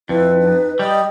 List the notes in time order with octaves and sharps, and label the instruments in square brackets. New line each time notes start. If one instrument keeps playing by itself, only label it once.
[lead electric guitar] F2 [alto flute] E4 [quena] B4
[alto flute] D#4
[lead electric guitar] G3 [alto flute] D#5